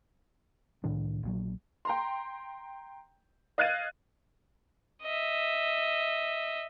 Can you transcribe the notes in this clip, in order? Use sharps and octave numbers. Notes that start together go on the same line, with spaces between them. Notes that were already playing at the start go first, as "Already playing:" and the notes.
C2 A2 D#3 D4
A#1 A#2 F#3
G5 A#5 C6
D#5 F5 F#6 G#6 A6 D#7
D#5 E5